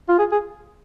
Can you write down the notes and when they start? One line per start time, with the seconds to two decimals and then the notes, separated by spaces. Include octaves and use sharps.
0.09 F4
0.19 G#4
0.32 G#4